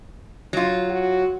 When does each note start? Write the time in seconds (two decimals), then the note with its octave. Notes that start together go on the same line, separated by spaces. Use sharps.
0.53 F#3 F4
0.90 F#4